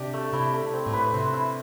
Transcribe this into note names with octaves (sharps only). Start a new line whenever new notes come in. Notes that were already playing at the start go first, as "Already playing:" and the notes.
Already playing: C3 D4 G4
A3
C3 E4
A3
C4
A2
B4
C3 C5
E4